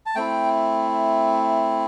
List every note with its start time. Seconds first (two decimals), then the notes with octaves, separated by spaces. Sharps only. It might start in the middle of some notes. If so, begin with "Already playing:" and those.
0.06 A5
0.15 A3 C4 E4 G5